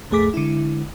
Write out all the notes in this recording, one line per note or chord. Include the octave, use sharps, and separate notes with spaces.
B1 F2 A3 G#4 D6 B6
D3 G#3 E4